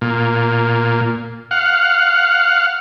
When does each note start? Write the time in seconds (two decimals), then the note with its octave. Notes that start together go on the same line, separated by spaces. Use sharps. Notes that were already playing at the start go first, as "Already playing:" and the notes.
0.01 A#2
1.51 F5 F#5